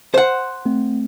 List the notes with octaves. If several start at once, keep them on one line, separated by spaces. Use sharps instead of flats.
C5 F#5
A3 C4